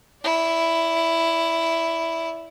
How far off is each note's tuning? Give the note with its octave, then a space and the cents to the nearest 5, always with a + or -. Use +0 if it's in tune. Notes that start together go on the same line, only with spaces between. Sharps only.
E4 +0 D5 -30